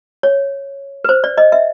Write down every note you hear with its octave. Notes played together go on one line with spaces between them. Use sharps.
C#5
B4
C5
D5
D#5
E5